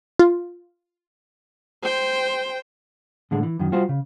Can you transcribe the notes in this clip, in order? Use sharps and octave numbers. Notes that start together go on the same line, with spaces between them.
F4
C5 G5
A2 D3 G#3
E3
F#2 D#3
G3 F4 F#4 C5
C#3